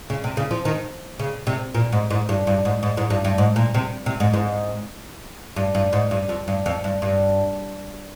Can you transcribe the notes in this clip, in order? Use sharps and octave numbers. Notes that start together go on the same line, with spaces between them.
C#3
C3
C#3
F3
D#3
C#3
C3
A#2
G#2
G#2
G2
G2
G#2
G#2
G#2
G2
G2
G#2
A#2
C3
C3
G#2
G#2
G2
G2
G#2
G2
F2
G2
F2
G2
G2